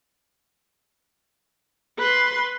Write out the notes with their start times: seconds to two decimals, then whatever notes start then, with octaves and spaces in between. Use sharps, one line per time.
1.99 B4 C6